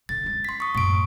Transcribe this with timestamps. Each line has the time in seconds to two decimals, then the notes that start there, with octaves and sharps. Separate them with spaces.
0.09 D3 A6
0.23 G#3 C#4
0.45 C6 B6
0.60 C#6 D#6
0.75 F#2 A2 C#6 D7